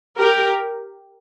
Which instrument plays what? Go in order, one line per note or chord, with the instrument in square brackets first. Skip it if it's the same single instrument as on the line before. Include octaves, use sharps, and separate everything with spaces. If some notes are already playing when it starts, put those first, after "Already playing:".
[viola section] G4 A#4